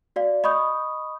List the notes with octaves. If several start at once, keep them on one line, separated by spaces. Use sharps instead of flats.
F#4 D5 F5
D#5 B5 C#6 D#6 G6